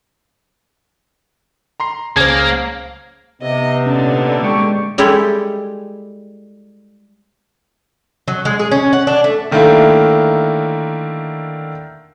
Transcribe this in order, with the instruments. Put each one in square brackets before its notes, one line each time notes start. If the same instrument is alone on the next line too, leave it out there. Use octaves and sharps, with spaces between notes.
[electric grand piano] A#5 C6 C7
[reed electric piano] C#2 C5 [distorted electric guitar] A#3 [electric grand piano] C#4 G#4 A5 [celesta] G#6
[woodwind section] C3 [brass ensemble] B3 D#4 [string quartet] D#5
[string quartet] A#2 D3 D4 [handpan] C#4
[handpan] G#3 [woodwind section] G4 G5 C#6
[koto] G3 G#3 D#4 E4 G4 A4
[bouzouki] F#3
G#3
G#4
C#4
F#5
D4
A3
[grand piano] D3 D#3 A3 A#3 E4